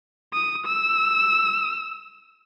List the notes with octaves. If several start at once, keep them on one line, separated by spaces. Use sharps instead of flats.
D#6
E6